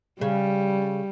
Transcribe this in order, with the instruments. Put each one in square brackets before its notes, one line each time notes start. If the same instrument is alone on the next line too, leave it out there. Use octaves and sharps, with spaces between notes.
[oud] C#3 [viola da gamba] G3